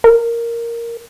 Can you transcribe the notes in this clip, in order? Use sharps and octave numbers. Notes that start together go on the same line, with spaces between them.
A#4